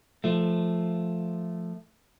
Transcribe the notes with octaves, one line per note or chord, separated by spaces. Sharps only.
F3 A3